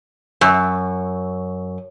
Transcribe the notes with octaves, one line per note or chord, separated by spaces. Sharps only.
F#2